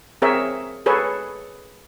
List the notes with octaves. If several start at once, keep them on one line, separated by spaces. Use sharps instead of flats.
C4 G#4 A#4 C#5 E5
G#4 A4 B4 C#5